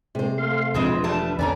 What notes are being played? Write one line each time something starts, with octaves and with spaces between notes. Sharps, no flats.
C3 G#3 C5
A3 F5 C6
E1 D3 F3 G#3 C4 G#4 B4
G3 A3 A5
E2 C#4 A4 D5 G#5 A#5